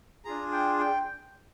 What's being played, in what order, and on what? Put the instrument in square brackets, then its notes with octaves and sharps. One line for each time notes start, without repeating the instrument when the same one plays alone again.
[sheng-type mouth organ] D4 F4 G#4 A#5
G5
G5